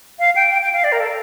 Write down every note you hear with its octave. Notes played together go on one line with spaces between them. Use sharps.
F5
G5
G5
G5
F5
D5
A#4
A4